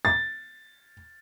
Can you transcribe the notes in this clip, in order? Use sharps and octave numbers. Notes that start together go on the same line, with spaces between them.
A6